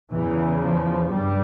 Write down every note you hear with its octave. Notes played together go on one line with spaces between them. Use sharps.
E2 C#3 E3
F3
G2 G3